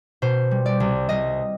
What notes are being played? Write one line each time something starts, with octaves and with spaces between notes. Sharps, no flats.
B2 C5
G3
D5
C2
C2 D#5